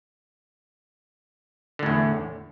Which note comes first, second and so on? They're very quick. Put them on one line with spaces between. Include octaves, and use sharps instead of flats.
D3 A2 E2